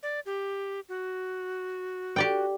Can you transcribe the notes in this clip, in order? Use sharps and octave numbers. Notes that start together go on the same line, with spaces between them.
D5
G4
F#4
G4 D5 G5